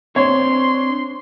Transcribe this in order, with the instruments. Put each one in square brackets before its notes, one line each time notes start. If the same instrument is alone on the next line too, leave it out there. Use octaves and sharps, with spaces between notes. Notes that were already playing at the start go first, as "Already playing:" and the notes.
[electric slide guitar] C4 D4 C5 [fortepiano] C#5 [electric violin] C6